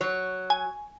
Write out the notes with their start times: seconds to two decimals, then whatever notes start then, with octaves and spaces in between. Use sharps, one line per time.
0.01 F#3 C#5
0.50 G#5